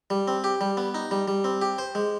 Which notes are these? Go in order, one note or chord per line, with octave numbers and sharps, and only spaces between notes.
G3
C4
G4
G3
B3
D#4
G3
G3
C4
G4
C5
G#3